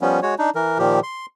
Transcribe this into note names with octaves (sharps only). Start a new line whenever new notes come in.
F3 G3 B3 C#4
G#3 F#4 C#5
D4 D#4
E3 A#4
A#2 D#3 F3 G4
C6